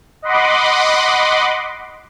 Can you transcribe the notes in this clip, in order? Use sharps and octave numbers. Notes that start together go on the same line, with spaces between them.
D#5 F#5 B5 C6 D6